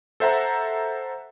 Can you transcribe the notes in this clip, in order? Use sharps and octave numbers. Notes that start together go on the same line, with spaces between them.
A4 C5 E5 F#5 A#5